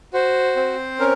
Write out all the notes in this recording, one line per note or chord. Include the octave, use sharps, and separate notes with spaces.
F#4 C5
C4
C#4 A#4